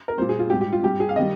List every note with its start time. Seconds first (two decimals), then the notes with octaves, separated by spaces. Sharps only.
0.08 A#4
0.18 A#2 G3 C5
0.29 G#4
0.39 F4
0.50 G#2 G3 G4
0.61 G4
0.72 F4
0.83 G2 G3 G4
1.00 G#4
1.09 F5
1.16 D#3 G3 D#5